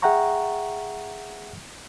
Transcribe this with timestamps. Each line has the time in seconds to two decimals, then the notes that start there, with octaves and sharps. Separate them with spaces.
0.02 G#4 E5 F#5 G5 A#5 C#6